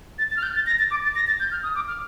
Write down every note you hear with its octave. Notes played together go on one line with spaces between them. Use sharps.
A6
A6
F6
G6
A6
A#6
A6
D6
A6
A#6
A6
G6
F6
D#6
D6
F6